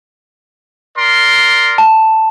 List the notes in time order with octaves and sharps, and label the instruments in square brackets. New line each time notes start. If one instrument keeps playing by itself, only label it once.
[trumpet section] A#4 D5 C6
[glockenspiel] A5